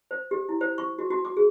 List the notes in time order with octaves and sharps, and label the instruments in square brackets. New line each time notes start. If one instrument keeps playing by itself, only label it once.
[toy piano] C5
G4
E4
C5
C#6
F#4
F#4
D6
G#4